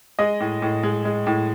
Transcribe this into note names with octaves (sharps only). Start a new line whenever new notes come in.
G#3 D#5
A2
A2
G#3
G#3
A2